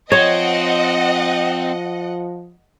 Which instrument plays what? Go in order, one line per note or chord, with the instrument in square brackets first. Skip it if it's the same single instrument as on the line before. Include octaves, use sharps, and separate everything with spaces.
[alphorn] F3 [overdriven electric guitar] C4 [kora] C#5 [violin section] D#5 F#5